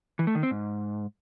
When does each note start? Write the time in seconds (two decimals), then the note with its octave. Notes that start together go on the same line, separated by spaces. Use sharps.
0.19 E3
0.27 A3
0.35 D#3
0.43 C4
0.51 G#2